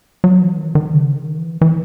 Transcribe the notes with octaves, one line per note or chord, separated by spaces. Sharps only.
F#3
E3
D#3
D#3
C#3
D#3
E3
E3